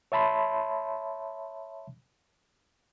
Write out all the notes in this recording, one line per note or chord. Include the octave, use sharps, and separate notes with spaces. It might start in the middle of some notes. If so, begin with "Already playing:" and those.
C#5 E5 A5 B5 C6